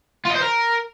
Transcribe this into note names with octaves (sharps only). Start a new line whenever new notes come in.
F4
D#5
C5
A#4